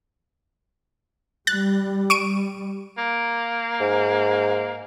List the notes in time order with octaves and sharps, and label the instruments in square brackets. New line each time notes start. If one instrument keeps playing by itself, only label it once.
[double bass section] G3 [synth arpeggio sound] F#6 A6
[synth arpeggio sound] C#6 D7 D#7
[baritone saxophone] A#3
[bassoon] G#2